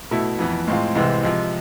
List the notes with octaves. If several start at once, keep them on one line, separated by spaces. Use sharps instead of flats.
B2 A3 E4
F2 E3 B3
A2 G#3 C4 F4
C2 C3 E3 G#3 C4
C3 F3 G#3